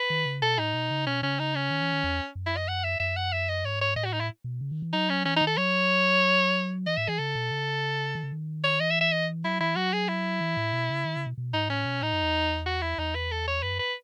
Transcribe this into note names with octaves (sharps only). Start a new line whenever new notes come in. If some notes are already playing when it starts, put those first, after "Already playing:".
Already playing: B4
D#3
C#3
B2 A4
A2 D#4
B2
C#3
B2 C#4
C#3 C#4
D#4
C#4
D#3
E3
D#3
E2
F#2
E4
D#5
F#5
E5
F#2 E5
F#5
E5
D#5
G#2 C#5
C#5
A2 D#5
F#4
D#4
E4
B2
C#3
D#3
E3
F#3 D#4
C#4
E3 C#4
D#4
D#3
A4
F#3 C#5
E3 D#5
A2 E5
E3 G#4
C#3 A4
B2
C#3
D#3
C#3
D#3
C#5
E3 D#5
E5
E5
D#5
F#3 E4
E3 E4
F#3 F#4
G#4
E4
E3
A2
B2
C#3
D#3
C#3
B2
B2
G#2 D#4
A2 C#4
B2
A2 D#4
F#2
E2
F#4
E4
E2 D#4
B4
A4
C#5
F#2 B4
B4